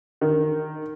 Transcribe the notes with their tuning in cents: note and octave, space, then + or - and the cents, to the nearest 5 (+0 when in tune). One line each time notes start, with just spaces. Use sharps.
D#3 -15